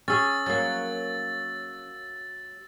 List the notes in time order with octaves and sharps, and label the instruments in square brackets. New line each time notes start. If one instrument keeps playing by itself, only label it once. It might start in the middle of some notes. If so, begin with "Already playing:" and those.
[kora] C#4 G#4 [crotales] E6 A6
[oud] F#3 A#3 [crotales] A6